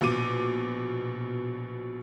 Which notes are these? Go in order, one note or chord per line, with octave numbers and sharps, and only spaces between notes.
A#1 B2 D6 D#7